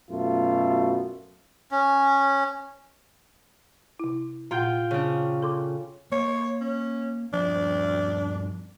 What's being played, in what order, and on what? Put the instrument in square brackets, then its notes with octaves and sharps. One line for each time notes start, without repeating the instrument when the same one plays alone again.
[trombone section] F#2 B2 A3 F4
[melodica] C#4
[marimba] C3 E4
[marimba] A#2 F#5 [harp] F4 G5 G6
[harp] C#3 D4
[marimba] A4 C6 D6
[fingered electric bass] A#3 [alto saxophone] C#5
[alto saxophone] C#4
[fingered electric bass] G2 F3 [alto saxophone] D4